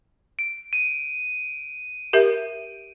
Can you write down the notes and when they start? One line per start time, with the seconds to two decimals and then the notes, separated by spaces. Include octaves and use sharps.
0.39 D7
0.73 D#7
2.13 G4 A#4 E5